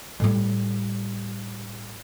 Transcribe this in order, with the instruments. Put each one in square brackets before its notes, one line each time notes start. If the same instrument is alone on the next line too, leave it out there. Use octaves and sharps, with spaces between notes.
[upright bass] A2 G3